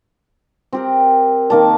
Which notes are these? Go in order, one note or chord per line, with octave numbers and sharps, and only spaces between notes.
C4 G4 A#4
D#3 A#3 A5